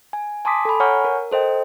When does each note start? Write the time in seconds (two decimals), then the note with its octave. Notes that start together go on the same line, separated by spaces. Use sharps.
0.13 G#5
0.45 G#5 A5 C6 D6 D#6 B6
0.65 A4 G#5 B5
0.80 C#5 F#5 G#5 A#5 C#6 F6
1.05 A#4
1.31 A4 C5 D#5 G5